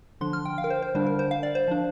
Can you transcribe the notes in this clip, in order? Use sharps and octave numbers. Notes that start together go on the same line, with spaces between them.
D3 F3 D4 C6
F6
G5
F5
A#4
C5
C5
D3 G3 D4 C5
A#4
C5
F5
D5
C5
F3 D4